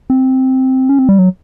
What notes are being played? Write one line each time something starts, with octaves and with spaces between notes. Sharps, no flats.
C4
C#4
C4
G3
F#3